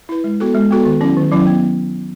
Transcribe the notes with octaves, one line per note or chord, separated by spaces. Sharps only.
E4 B4
G#3
B3 F#4 A4
G#3
B3 F#4 A4
D#3
F#3 C#4 E4
D#3
F#3 C#4 E4
B3